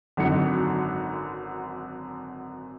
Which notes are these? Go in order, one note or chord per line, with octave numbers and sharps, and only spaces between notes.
G#1 F#2 D3 F#3 D#4 C#7